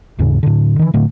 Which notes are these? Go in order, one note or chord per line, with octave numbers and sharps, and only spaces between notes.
D#2 G#2 C#3
A2 D3
D#3 E3
A2 D3 A3